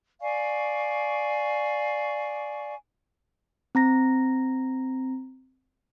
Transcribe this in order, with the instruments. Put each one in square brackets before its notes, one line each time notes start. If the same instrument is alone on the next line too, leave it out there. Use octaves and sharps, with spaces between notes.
[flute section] D5 F5 G#5 C#6
[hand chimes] C4 A#5 A#6